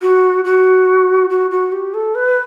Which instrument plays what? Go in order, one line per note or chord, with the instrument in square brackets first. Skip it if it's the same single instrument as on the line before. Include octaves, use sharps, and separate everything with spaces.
[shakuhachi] F#4
F#4
F#4
F#4
G4
A4
B4